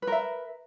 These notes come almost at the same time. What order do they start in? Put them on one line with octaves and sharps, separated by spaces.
B4 A#4 E5